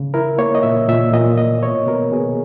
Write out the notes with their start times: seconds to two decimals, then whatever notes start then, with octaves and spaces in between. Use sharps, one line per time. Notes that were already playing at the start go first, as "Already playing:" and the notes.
Already playing: C#3
0.14 E4 A#4
0.38 A#3 C#5
0.55 D#5
0.63 A#2 E5
0.88 A#2 E5
1.14 A#2 D#5
1.38 A#3 D#5
1.62 B2 C#5
1.87 B2 A#4
2.12 B2 G#4